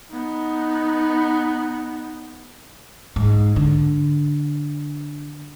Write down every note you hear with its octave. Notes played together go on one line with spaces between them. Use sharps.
B3 D#4
G#2
D3